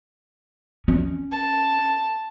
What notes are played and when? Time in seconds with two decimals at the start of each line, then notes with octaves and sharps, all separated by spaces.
0.88 C#4
1.32 A5